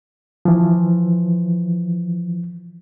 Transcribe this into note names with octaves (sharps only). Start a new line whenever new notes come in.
E3 F3